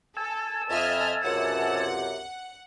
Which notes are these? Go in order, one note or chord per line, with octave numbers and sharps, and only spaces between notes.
A4 G#5 A5 E6
F2 D#5 E5 F6
C#2 F#2 C3 F#5